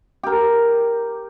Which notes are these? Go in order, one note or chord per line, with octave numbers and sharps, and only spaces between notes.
G4 A#4